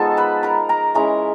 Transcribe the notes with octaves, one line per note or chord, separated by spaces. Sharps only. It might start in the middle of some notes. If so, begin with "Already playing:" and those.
Already playing: F3 G#3 B3 D#4 A4 A5
B4 B5
A#4 A#5
A#4 A#5
E3 G#3 C#4 E4 A#4 A#5